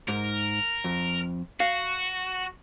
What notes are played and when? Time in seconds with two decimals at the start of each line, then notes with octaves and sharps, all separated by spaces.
0.08 G#2 A#4
0.84 F2
1.60 F#4 F5